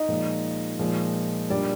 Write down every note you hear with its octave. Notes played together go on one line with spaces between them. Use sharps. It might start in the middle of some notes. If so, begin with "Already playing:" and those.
Already playing: D#4 D#5
A#2 F3 G#3
A#2 F3 G#3
A#2 G3 D4 D5